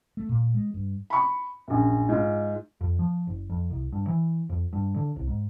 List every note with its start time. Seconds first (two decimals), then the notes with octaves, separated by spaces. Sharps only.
0.17 A3
0.29 A#2
0.54 G#3
0.74 G2
1.10 B5 C#6
1.68 A#1 F#2
2.09 G#2 F4
2.81 F2
2.99 F3
3.27 F#1
3.50 F2
3.70 C2
3.93 G2
4.07 E3
4.49 F2
4.73 G2
4.96 D3
5.16 C2
5.27 G#2